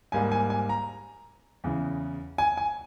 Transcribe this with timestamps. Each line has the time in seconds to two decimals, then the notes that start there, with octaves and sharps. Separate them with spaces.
0.12 G#2 G3 A#3 G#5
0.32 G#5
0.50 G#5
0.69 A#5
1.64 E2 C#3 E3
2.38 G#5
2.57 G#5